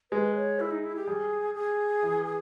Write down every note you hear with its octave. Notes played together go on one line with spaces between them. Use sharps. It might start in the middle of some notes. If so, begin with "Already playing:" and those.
G#3 B4
C#5
E4
D#4
E4
G4
G3 G#4
G#4
E3